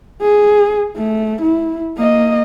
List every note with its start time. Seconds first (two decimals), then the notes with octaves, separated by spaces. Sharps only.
0.21 G#4
0.96 A3
1.41 E4
1.97 A#3 D#5